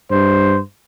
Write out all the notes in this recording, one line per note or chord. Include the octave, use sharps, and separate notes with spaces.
G2 C5